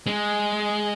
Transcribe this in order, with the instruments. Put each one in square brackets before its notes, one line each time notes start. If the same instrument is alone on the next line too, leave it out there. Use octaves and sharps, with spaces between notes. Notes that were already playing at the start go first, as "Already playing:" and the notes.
[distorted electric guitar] G#3